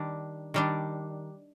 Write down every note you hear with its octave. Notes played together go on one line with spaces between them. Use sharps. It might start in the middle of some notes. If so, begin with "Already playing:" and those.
Already playing: D#3 G3 D4
D#3 G3 D4